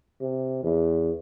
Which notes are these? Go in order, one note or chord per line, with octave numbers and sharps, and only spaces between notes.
C3
E2